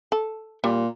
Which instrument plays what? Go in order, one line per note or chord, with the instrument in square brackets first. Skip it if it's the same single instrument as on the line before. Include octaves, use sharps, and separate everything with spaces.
[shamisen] A4
[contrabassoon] A#2 [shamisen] G3